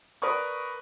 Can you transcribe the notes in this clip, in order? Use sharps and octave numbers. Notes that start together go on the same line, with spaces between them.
A#4 B4 D5 C#6 D#6